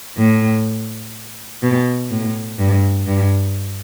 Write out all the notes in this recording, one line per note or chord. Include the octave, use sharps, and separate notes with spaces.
A2
B2
A2
G2
G2